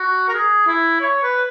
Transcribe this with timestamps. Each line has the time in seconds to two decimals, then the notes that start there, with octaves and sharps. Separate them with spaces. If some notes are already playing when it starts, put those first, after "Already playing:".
Already playing: F#4
0.28 A#4
0.34 G#4
0.66 E4
1.01 C#5
1.22 B4